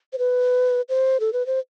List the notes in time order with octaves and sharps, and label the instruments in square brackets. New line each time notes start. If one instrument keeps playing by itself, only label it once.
[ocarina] C5
B4
C5
A4
B4
C5